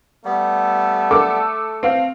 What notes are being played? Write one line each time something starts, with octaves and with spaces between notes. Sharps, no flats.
G3 A3 B3
A4 D6
C4 F5